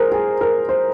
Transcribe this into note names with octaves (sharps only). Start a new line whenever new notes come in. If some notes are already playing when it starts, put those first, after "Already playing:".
Already playing: G#4 A#4 C5
G#4
A#4
C5